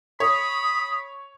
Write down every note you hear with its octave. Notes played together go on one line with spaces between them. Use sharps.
C#5 B5 D#6